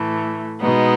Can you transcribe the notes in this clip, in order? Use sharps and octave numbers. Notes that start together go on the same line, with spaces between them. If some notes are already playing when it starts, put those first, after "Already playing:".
Already playing: A2 E3 A3
B2 G#3 B3 D#4